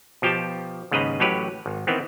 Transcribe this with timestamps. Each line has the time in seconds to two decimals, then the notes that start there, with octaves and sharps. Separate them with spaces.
0.22 B2 F3 G4 G5 A5
0.91 D#2 G#2 C#3 B4 D#5 A#5
1.20 A1 A2 F#3 G4 B4 C#5
1.66 G#1
1.87 D#3 E3 B3 C4